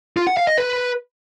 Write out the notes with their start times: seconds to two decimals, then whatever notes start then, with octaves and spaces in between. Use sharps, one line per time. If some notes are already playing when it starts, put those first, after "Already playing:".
0.17 F4
0.27 F#5
0.37 F5
0.47 D#5
0.58 B4